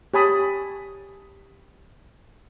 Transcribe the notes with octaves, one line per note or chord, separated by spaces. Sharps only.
G4 C#5 G#5 A5 B5 D#6